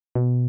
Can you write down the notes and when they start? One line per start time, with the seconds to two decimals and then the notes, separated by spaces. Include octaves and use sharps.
0.15 B2